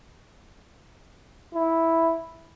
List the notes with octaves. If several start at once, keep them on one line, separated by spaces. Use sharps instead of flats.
E4